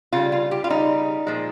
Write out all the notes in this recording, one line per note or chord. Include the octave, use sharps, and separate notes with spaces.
C#3 G3 F4
F4
G4
F4
C#3 G3 D#4
A#2 F3 G#3